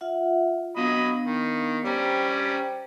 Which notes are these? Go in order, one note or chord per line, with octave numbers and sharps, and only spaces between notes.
F4 E5 F#5
F#3 B3 D4 D#5 F5 B5
D#3
G3 C#4 C5 G5 A#5